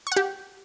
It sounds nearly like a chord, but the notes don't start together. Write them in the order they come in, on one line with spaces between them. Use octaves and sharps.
C#6 F#5 G4